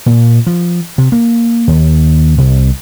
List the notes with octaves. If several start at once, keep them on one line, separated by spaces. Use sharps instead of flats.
A#2
F3
C3
A#3
D#2
C2